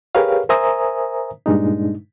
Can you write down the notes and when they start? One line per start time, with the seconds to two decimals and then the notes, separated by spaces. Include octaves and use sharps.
0.15 G4 G#4 A#4 B4 C#5 F5
0.49 A#4 C5 E5 G#5 A#5 D#6
1.46 G2 A#2 G#3 D4 D#4